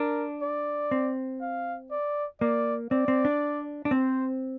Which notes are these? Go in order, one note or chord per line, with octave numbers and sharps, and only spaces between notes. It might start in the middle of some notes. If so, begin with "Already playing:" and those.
Already playing: D4 A#4
D5
C4
F5
D5
A#3 D5
C4 D5
C4
D4
D4
C4 C5